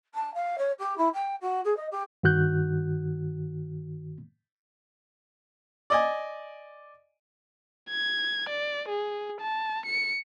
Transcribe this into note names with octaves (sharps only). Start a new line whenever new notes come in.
A5
F5
C#5
G4
E4
G5
F#4
G#4
D#5
G4
G2 D#3 F#4 F#6 G6
D5 D#5 G#5
G#6
D5
G#4
A5
C#7